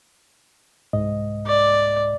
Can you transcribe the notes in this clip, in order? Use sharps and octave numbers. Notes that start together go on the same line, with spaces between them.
C2 G#2 D#5
D5